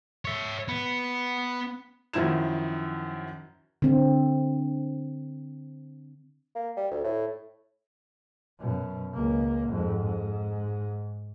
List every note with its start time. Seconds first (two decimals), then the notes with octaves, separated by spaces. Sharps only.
0.25 C#5 E5
0.68 B3
2.13 F#2 D#3 F3 E4 G#6 E7
3.82 D3 C4
6.55 A#3
6.77 G3
6.91 D2
7.04 A2
8.60 F#2 B2
9.14 C#2 A#3
9.68 F2 G#2
10.02 G#2